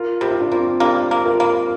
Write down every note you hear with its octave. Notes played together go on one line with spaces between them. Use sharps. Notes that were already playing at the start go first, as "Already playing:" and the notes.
Already playing: F4 A#4
C3 G4
F4
D4 G4
A#3 C4 F4
A#3 D4 G4
A#3
F4 A#4
A#3